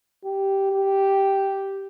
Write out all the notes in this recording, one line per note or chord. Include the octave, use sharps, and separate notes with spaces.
G4
G4